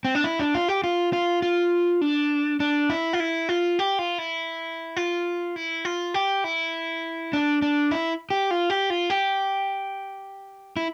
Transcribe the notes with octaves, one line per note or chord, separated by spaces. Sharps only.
C4
D4
E4
D4
F4
G4
F4
F4
F4
D4
D4
E4
F4
E4
F4
G4
F4
E4
F4
E4
F4
G4
E4
D4
D4
E4
G4
F4
G4
F4
G4
E4